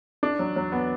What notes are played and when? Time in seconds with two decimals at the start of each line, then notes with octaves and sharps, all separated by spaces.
0.23 D4
0.39 F#3
0.56 F#3
0.72 B3